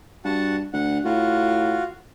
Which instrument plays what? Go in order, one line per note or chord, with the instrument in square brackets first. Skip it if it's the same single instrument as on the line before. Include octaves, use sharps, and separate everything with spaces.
[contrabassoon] G2 [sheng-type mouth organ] F#4 F#5 A5
[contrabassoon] D2 [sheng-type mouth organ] F#5
[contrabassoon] A2 [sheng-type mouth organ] F4 F#4